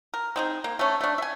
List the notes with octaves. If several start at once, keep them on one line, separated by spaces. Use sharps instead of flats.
A#4
C4 D#4 G#4
A#3
A3 C#4
A3 D4
E5 G#5